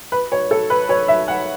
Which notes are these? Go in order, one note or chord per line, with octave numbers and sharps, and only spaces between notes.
B4
C#5
A4
B4
C#5
E5
F#5